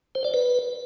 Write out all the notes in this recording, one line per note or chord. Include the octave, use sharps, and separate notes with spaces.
C5
D5
B4